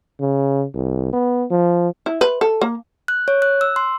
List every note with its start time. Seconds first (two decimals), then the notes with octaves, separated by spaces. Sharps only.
0.20 C#3
0.74 C2
1.13 B3
1.51 F3
2.06 E4
2.21 B4
2.41 A4
2.61 A#3
3.08 F#6
3.28 C#5
3.42 F#6
3.61 E6
3.76 C6